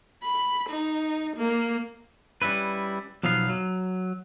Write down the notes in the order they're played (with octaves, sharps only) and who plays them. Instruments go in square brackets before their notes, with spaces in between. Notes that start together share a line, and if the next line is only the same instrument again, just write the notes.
[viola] B5
D#4
A#3
[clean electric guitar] G3 C#4 E4 B4
B1 F3 F#3 B3 F5
F#3